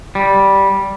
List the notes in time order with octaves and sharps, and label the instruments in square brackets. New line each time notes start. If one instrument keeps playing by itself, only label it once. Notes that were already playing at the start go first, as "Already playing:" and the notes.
[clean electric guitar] G3